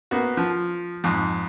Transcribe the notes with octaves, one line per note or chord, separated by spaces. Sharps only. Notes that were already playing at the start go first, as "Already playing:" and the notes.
A#3 B3 F#4
F3
F2 G#2